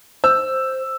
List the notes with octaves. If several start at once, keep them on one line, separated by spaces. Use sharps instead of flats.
C5 E6